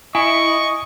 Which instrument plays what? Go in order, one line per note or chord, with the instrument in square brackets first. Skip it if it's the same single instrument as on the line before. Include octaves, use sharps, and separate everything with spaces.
[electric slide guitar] E4 [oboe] D#5 [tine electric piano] G#5 [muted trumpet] C#6